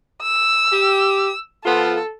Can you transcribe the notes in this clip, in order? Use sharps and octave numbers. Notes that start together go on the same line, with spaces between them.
E6
G4
F3 B3 F4 A4